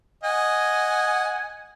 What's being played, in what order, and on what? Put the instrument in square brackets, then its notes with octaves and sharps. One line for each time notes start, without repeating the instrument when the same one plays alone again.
[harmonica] D#5 F#5 [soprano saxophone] G#5